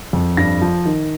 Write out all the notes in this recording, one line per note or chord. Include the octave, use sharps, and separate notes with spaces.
F2
G2 A#6
F3
D#3